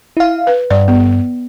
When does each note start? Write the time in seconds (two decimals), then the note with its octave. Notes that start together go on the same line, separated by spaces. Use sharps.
0.17 E4 F5
0.47 B4
0.71 G2 D5
0.88 B3